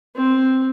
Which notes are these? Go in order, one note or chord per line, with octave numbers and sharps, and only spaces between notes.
C4